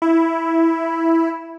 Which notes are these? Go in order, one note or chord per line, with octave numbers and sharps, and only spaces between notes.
E4